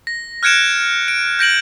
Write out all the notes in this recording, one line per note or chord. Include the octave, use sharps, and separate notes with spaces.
A#6
F6 F#6 G#6 C#7 D7 E7
D7
G6 A#6 D7 F#7